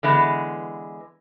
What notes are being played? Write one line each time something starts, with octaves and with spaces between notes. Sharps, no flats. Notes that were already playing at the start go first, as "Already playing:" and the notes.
D3 E3 G#3 B3